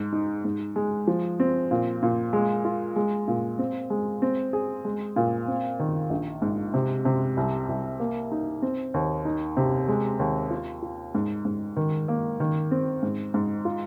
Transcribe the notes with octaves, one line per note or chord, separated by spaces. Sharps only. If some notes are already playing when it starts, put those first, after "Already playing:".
Already playing: G#2
D#4
G#2
G#3
F3
C4
A#2
A#2
G#3
F4
G#3
A#2
C4
G#3
C4
G#4
G#3
A#2
C4
D#3
A#1
G#2
C3
C3
C2
C2
A#3
D#4
C4
D#2
D#4
C3
G#3
D#2
F4
F4
G#2
G#2
D#3
A#3
D#3
C4
G#2
G#2
F4